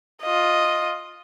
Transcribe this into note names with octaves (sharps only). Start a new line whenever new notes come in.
F4 D#5